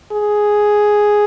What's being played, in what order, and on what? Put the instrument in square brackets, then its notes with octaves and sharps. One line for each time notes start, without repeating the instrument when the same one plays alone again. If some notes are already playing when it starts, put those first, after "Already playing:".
[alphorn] G#4